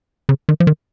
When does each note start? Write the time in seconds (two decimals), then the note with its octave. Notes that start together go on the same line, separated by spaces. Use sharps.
0.29 C#3
0.49 D#3
0.60 F3
0.67 D#3